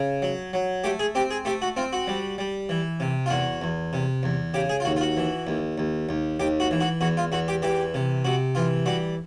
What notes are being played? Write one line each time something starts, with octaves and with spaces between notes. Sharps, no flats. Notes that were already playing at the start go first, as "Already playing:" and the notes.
Already playing: C#3
F#3
F#3
A3 G4
G#4
C4 G4
G#4
A3 G4
F#4
C4 F4
F#4
G3
G3
E3
C3
F4
E2 F#4
E2
C3
E2
C#3 G4
G#4
F4
D#2 F#4
F4
F#4
E3
D#2
D#2
D#2
D#2 G4
F#4
E3
F#4
E2 F#4
F4
E2 F#4
G4
E3 G4
C3
C3 F#4
E3 F4
G3 F#4